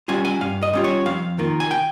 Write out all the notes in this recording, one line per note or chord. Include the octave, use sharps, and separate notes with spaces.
G3 C#4 F4 G#5
G#5
G2 F5
D#5
G3 C#4 F4
C#5
F2 F5
D#3 A#3 F4
G#5
G5